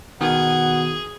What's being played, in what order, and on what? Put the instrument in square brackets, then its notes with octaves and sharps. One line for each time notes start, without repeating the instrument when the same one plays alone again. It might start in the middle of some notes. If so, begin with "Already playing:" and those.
[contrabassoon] B2 [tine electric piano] D#3 [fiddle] G#4 [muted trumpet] F#5